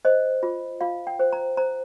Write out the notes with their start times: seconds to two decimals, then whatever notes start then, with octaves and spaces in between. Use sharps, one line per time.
0.05 C5 D#5
0.43 F4
0.81 F4 F5
1.07 G5
1.19 C5
1.33 A#5
1.57 C5 A#5